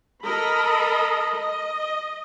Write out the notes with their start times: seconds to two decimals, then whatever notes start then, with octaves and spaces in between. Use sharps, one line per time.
0.24 A4 A#4 D#5 B5
1.34 D#5